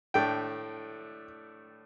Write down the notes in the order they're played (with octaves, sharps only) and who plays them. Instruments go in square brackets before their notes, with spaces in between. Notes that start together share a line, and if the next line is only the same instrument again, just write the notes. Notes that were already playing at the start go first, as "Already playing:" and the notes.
[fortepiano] A2 A3 D4 G5